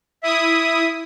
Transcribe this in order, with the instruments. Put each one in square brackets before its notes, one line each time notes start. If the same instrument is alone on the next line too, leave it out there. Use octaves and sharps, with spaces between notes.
[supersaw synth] E4 D#6 [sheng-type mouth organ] E5